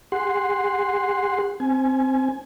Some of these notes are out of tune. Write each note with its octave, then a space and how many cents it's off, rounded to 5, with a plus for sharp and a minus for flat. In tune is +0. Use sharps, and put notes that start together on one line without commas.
G#4 -45 F#5 +0 C6 +0
C4 +0 G#5 +15